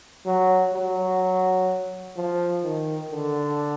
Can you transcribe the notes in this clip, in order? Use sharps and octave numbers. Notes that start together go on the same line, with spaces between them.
F#3
F#3
F3
D#3
D3